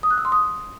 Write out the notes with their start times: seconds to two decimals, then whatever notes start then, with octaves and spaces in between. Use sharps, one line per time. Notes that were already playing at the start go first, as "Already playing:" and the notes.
0.03 D#6
0.10 F#6
0.18 E6
0.25 C6
0.32 D#6